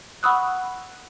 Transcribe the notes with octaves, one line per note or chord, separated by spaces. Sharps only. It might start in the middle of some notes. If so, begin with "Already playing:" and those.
F#5 B5 C#6 D#6 E6 F#6